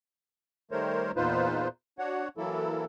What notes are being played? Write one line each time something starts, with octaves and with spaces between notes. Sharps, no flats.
D#3 G3 A3 A#4 C5 C#5
E2 A#2 D#4 F4 B4 C5
D4 F#4 C#5 F#5
E3 F#3 A#3 E4 A4